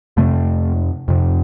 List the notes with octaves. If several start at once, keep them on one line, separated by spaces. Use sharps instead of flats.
F2 C3 A3
F2 C3